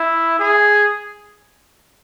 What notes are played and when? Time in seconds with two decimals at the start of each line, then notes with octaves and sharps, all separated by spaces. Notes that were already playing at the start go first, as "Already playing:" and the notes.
Already playing: E4
0.40 G#4